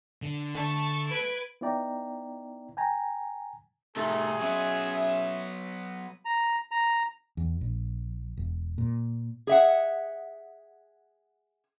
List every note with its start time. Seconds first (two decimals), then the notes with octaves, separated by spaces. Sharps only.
0.22 D3
0.55 D3 A3 A5 C#6
1.07 B4 G#6 D7
1.61 B3 D#4 E4 D5 G5 A#5
2.77 G5 G#5 A#5
3.96 A2 C3 D#3 A3 G#4
4.40 F#3 B3 C#4 E5
6.25 A#5
6.71 A#5
7.37 E2
7.61 A#1
8.37 E1
8.78 A#2
9.47 G#4 E5 F#5